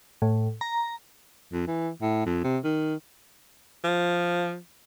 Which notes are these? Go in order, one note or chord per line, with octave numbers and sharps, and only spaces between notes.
A2
A#5
F2
E3
A2
F2
C3
D#3
F3